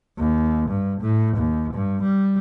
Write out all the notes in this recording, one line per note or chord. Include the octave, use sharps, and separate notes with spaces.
D#2
G2
A2
D#2
G2
G3